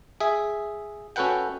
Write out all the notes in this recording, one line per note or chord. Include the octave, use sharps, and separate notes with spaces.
G#4 E5
C#4 F#4 A4 B4 F#5 G5